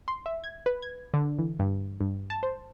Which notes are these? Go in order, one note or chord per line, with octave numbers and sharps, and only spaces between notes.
C6
E5
G#6
B4
G#6
D3
E3
G2
G2
A5
C5